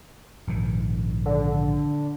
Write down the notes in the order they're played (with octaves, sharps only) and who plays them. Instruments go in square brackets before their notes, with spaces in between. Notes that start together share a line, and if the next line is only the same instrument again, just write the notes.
[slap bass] A#1 G#2 D#3
[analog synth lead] D3